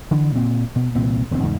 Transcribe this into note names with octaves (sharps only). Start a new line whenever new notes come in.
D3 E3
A#2 C4
B2
C2 A#2 E3 C4
E1 D#2 D3 C4
E2 G#2 C#3